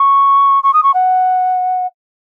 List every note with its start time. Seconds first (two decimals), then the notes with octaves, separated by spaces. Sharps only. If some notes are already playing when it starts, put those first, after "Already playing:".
Already playing: C#6
0.63 C#6
0.73 D#6
0.83 C#6
0.94 F#5